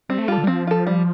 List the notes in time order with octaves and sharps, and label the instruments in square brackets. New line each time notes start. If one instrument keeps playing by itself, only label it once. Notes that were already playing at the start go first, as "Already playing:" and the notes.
[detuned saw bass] G3 [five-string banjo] C4
[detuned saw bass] A3
[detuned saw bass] G3 [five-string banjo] F4 A4
[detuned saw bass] D3
G3
[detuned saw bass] F3 [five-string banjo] C4
[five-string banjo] F4 A4
G3